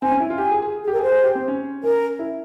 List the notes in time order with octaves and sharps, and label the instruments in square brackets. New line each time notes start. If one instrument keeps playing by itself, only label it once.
[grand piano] C4 [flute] G#5
[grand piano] C#4
E4
F4
[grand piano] G4 [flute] G#5
[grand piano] G#4
G#4
[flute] G#4
[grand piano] G4
[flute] A#4
[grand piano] G#4 [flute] C5
[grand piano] G#4
G4
C4
C#4
[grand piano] C#4 [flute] A#4
[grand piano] E4